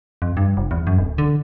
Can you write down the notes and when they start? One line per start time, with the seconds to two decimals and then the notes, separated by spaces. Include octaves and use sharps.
0.22 F2
0.37 G2
0.57 F1
0.71 E2
0.87 F#2
0.98 D1
1.18 D3